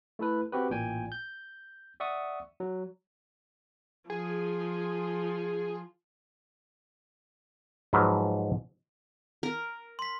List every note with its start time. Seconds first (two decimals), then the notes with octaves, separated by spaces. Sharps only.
0.19 A3 E4 A4 B4
0.52 C4 F#4 G4 B4
0.70 A1 A#2 G5 G#5
1.12 G6
2.00 D5 E5 F#5 C#6 D#6
2.60 F#3
4.10 F3 G#4
7.93 G#2 F3 F#3 B4 E5 F5
9.43 A#4
9.99 C6 B6